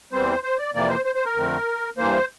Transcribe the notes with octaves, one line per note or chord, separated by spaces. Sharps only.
E2 E3 G3 C4 C5
C5
D5
F2 C3 E3 A#3 D5
C5
C5
C5
A#4
F2 D3 A3 C4
G2 E3 A#3 C5